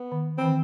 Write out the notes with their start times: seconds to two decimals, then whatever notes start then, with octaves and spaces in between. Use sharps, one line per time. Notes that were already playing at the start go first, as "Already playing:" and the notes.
Already playing: B3
0.12 D#3
0.38 E3 C4
0.45 D#3